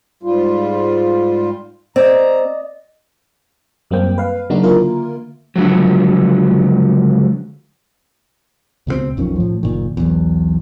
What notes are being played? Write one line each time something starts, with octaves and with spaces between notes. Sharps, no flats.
G#2 G3 F4
C4 D5 D#5 A#5
F#2 G3 A#3 C4 G5
B4 F5
C#3 F#3 A#3 D4 D#4 F#4
D3 A#3 E4 F4 A#4
C#2 D3 D#3 F3 F#3
C#2 B2 F#3 C4
B1 F2 D#3 C#4
A2 F3
F#1 A#2 D#3
B1 E2